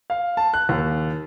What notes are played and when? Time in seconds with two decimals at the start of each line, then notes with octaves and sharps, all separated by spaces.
0.10 F5
0.37 A5
0.54 F#6
0.69 D#2